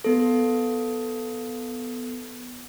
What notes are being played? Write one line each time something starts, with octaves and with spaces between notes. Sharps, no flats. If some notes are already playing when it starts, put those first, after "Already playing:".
B3 A4